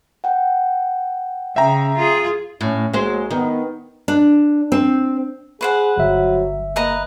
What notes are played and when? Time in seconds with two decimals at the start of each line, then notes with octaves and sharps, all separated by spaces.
0.24 F#5 G5
1.56 C#3 E5 G5 A#5
1.97 F4 G#4
2.61 A2 C#4
2.94 B1 F#3 G#3 A#3 C5
3.31 D#3 B3
4.08 D4
4.72 C4
5.61 G#4 B4 C5 F#5
5.98 G1 F#3 E5
6.76 A#3 B4 D#5 A#5